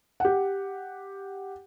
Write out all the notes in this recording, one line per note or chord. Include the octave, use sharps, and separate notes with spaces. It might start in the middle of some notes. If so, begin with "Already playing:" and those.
G4 F#5